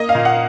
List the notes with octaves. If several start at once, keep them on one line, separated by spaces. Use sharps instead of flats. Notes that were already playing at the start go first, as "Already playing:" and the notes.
Already playing: A#3 D#5
F5
A#2
F#5